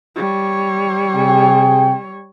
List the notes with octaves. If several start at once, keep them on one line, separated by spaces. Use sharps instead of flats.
G3 C#5
C3 G#4 G5